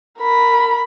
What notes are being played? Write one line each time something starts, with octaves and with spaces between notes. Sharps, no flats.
A#4 B5